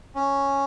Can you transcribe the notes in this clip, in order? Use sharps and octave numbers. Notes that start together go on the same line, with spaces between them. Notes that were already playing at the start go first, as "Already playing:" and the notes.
C#4